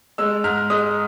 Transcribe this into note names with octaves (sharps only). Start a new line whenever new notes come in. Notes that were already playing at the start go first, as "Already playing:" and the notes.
G#3 E6
G#2 F6
G#3 D#6